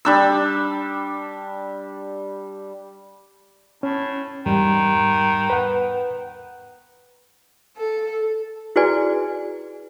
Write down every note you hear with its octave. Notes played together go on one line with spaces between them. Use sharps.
G3 D4 E6
A2 C#4
E2 G#2 D#3 G3
B4 F#5
A4
E4 F#4 G#4 B4 D5 G#5